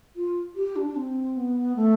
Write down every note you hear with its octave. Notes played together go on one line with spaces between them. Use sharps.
F4
G4
D4
D4
C4
B3
A3